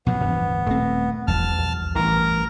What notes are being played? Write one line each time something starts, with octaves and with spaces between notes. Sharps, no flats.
B2 F3 F#3 B3
D1 G2 E3 F3
D#1 A3 C4
E1 E2 G2 F3 A5 F6
B1
A1 G2 E3 A#4 A#5